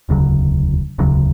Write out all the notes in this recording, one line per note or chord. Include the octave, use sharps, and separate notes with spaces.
E1 D2 C#3 F#3
E1 D2 C#3 F#3